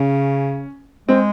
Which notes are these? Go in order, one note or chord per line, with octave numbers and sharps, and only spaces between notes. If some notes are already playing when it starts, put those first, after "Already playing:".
Already playing: C#3 C#4
G#3 C4